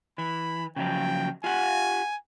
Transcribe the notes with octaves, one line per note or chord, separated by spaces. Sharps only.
E3 B5
C#3 F3 F#3 G5
F4 G4 F#5 G#5